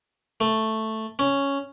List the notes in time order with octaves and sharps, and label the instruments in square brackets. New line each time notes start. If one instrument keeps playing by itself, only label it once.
[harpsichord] A3
C#4